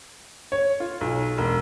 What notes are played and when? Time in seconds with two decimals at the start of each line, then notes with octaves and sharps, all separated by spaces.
0.52 C#5
0.80 F4
1.01 B1
1.38 E1